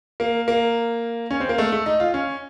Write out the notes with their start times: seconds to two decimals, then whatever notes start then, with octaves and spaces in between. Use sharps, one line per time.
0.20 A#3
0.48 A#3
1.31 C#4
1.40 C4
1.49 A#3
1.58 A3
1.72 A3
1.86 D#4
2.00 F4
2.14 C#4